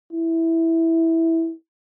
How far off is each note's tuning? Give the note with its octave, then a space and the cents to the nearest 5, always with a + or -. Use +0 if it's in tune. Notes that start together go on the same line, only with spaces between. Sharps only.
E4 -5